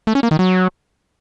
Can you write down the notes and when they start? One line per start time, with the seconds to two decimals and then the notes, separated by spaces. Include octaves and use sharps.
0.07 A3
0.15 C#4
0.23 A#3
0.31 D#3
0.39 F#3